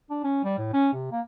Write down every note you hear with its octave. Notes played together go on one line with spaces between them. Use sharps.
D4
C#4
G3
A2
C#4
C3
A#3